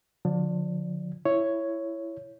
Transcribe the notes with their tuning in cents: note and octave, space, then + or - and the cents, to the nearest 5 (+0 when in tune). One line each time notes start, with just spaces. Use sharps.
D3 +0 F3 +35 D5 +0
E4 +15 C#5 +0